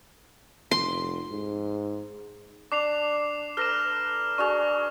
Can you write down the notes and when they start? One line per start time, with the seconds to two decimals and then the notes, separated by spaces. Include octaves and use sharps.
0.71 F1 C6
1.31 G#2
2.72 D4 D6 C7 F7
3.57 A4 B4 A#5 F6 A#6 E7
4.38 D4 F#4 G#4 C#6 F7